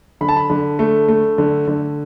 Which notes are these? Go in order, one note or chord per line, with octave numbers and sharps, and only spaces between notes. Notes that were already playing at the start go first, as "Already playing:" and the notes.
D3 B5
A5
B5
D3
A3
A3
D3
D3